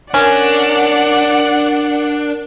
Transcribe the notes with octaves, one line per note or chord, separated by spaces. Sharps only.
C#4 D4 A#4 D5 F#5